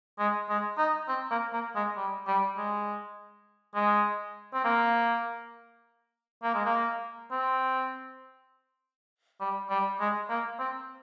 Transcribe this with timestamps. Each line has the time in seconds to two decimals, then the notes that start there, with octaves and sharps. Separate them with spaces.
0.19 G#3
0.49 G#3
0.78 D#4
1.08 C4
1.31 A#3
1.53 A#3
1.76 G#3
1.97 G3
2.28 G3
2.57 G#3
3.75 G#3
4.54 C4
4.65 A#3
6.44 A#3
6.54 G#3
6.66 A#3
7.32 C4
9.41 G3
9.70 G3
10.00 G#3
10.29 A#3
10.60 C4